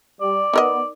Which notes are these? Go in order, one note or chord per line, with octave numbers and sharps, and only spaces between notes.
G3 D5
B3 D#4 A#4 D#5